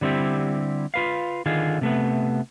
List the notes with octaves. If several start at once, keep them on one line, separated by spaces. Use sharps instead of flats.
D3 G3 C4 E4 G4
F4 B4 F5
D3 D#3 F4 G#4
C3 A3 B3